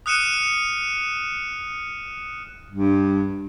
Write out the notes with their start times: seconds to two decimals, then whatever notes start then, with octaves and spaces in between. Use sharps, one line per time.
0.06 D#6 F6 F#6 C#7 D#7 E7
2.70 G2